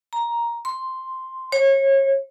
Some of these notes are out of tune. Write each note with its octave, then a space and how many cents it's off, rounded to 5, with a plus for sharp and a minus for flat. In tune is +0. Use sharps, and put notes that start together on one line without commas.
A#5 +10
C6 +0
C#5 -30